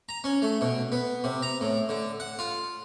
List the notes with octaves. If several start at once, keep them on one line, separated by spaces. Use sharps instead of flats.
A#5
C#4
A3
B2
B3
C3
A#5
A2
D3
F#5
F4